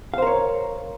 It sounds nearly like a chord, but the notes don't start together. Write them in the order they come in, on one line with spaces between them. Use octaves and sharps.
F5 C5 A#4 C#5